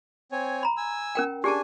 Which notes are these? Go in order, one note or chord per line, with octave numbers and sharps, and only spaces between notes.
C4 C#5 G#5
A#5 B5
G#5 E6
C#4 A#4 G5
D4 G4 G#4 G#5 A5